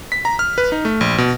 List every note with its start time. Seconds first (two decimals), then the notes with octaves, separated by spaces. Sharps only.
0.12 B6
0.25 A#5
0.39 F6
0.58 B4
0.72 D#4
0.85 A3
1.01 A#1
1.18 B2